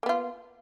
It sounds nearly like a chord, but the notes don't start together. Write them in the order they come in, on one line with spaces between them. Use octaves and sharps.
A#3 B3 F4